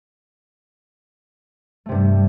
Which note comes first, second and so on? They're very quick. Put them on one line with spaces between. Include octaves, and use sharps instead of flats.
A3 C3 G2 G3